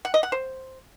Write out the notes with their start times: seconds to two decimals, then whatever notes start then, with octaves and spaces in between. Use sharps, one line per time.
0.05 F#5
0.14 D#5
0.23 F#5
0.32 C5